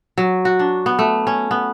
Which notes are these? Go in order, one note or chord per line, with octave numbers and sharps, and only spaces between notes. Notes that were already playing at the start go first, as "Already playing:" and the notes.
F#3
F#4
D4
B3
A3
C#4
B3